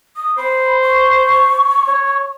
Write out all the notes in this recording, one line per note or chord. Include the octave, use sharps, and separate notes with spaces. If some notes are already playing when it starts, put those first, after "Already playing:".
D#6
C5 B5
C#6
C#5